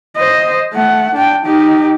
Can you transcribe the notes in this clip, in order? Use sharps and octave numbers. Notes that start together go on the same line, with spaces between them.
C5 D#5
A3 F#5
D4 G5
D#4 G4